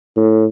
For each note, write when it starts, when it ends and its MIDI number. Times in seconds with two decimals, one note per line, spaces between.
0.17 0.45 45